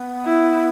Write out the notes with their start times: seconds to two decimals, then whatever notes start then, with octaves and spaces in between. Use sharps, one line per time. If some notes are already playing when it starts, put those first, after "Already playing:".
Already playing: B3
0.25 E4